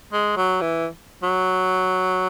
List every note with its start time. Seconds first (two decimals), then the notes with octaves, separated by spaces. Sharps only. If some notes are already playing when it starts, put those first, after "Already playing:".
0.13 G#3
0.37 F#3
0.61 E3
1.23 F#3